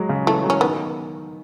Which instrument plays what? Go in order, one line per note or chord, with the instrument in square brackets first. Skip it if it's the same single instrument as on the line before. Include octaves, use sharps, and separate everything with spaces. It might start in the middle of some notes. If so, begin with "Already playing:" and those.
Already playing: [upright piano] F#3 G#3
C#3
[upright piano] E3 [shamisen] A3
[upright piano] F#3
[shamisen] C#4
[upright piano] D#3 [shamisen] B3